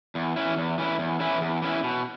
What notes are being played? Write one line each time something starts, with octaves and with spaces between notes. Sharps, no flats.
E2
E3 C#4 E4
E2
E3 C#4 E4
E2
E3 C#4 E4
E2
E3 C#4 E4
B2